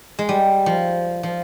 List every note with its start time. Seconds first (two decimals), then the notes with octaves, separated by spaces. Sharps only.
0.19 G#3
0.29 G3
0.66 F3
1.23 F3